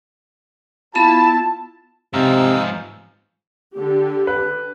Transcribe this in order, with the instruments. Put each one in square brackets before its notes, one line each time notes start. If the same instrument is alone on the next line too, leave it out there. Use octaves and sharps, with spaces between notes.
[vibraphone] B3 B5 [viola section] E4 F4 [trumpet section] A5
[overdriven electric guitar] G#2 F3 [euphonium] C3 [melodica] D#4 F5 E6
[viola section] D3 G4
[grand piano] B4